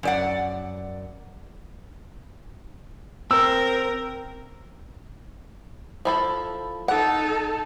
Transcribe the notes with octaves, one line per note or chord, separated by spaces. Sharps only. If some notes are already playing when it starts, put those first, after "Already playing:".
F#2 D5 F#5
C4 A#4 E6
F3 E4 A4
D#4 A4 F#5